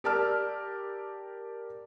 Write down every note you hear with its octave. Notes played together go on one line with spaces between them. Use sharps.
G4 A#4 D5 A5 E6 F6